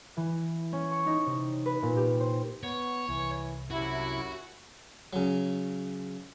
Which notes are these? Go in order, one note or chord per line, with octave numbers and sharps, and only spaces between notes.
E3
C#4
C#6
D#4
C3
B4
A#2
G4
C5
B3 C#5
C2 E3
F#2 C3 E4 F#4
C#3 F#3